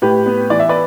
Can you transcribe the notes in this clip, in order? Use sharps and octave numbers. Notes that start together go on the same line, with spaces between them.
A2 G4 B4
B3
E3 D5
E5
B4 D5